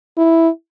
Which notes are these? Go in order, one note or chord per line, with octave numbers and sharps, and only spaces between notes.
E4